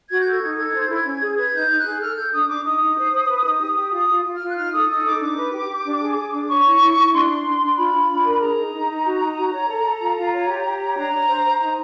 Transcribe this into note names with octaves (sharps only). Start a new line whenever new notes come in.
F#4 G#6
A4 G6
G#6
D#4
A4
C5
E4
C#4
G#4
B4 G#6
D#4 G6
D#4
F#6
G#4
A4 F6
A4 G6
D4 D#6
D4 D6
D#4 D#6
D#4
C5
C5
B4
D#4
G4
G4
F4 D#6
F4
F4
F6
F4
F#6
D#4 F6
A4 D#6
D#4 D#6
D#4 D6
D4 D6
B4
G4
G4
D4
G#4
G#4
D4
C#5 C#6
E4
E4
E4
D4 C6
D4
D4
D4 C6
F4 B5
F4
D4
A#4
G#4 A#5
D#4
D#4
D#4
F#4
D#4
F#4
C#5
A4
A4
F4
F4
C#5
G4
G4
C#5
D4 A#5
D4
C5
C5
D#4 A#5